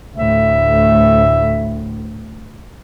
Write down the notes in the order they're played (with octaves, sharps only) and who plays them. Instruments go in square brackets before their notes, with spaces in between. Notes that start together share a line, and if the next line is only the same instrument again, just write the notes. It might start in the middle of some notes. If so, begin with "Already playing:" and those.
[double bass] D2 A2 [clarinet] E5